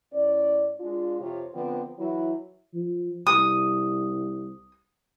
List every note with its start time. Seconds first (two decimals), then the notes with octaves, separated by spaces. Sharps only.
0.13 A2 C#4 D5
0.80 G#3 D4 F4
1.21 F2 C3 F4 C#5
1.53 D3 F3 B3 C4
1.99 E3 F#3 E4
2.74 F3
3.27 C2 D#6